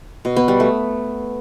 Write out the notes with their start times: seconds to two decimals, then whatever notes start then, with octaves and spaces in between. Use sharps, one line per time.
0.25 B2
0.36 B3
0.48 G3
0.60 A3